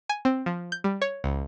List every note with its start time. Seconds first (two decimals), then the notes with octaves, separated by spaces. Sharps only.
0.09 G#5
0.25 C4
0.46 F3
0.72 G6
0.84 G3
1.02 C#5
1.24 C#2